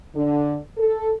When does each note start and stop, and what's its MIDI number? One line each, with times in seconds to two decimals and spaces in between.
0.15 0.57 50
0.78 1.13 69